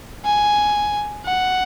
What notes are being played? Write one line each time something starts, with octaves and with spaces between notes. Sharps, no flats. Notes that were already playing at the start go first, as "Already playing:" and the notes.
G#5
F#5